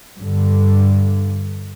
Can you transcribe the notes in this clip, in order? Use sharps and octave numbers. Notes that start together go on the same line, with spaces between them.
G2 D3